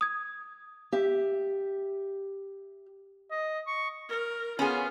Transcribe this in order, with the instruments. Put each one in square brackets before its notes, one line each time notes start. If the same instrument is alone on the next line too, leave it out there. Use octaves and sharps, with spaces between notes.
[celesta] D#6 G#6
[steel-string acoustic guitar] G4 E5
[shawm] D#5
C#6
[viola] A#4
[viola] B3 F4 [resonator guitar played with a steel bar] C#4 G#4